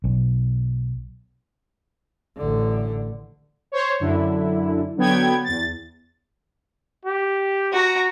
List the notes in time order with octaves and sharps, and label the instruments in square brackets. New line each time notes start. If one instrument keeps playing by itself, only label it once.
[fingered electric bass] B1
[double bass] A1 D3
[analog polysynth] C5 C#5
F#2 D3 E4
D3 F#3 B3 G5 G#6
E2 A6
[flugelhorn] G4
[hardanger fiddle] F#4 A#5